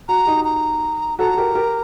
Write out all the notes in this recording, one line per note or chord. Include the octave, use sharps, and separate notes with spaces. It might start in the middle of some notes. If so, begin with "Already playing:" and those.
F#4 A#5
D#4 G4
A#5
F#4 A4 A#5
G4 A#4
G4 A#4